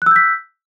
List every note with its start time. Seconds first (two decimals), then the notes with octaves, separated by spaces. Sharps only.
0.02 F#6
0.06 E6
0.11 G6
0.16 B6